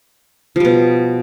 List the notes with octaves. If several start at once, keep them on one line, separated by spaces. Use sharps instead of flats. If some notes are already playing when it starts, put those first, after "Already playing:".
B2 F3 G3